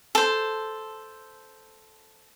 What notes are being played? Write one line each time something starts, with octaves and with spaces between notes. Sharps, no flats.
A4 C5